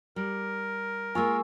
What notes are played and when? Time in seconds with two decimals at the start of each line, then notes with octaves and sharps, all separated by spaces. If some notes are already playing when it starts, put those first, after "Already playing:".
0.16 G3 A#4
1.15 G#3 A#3 F4 G#5 C#6 E6